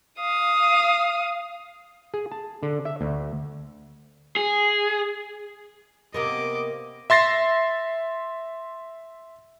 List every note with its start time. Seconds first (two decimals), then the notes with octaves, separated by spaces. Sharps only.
0.20 F5 D#6
2.14 G#4
2.32 A5
2.63 D3
2.85 E5
3.01 D2
4.37 G#4
6.14 C3 A#3 B3 D#5 D6
7.10 E5 C6 A6 A#6 C7